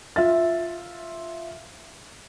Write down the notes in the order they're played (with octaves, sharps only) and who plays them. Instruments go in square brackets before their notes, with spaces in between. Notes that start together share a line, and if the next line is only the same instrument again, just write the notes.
[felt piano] F4 E5 A6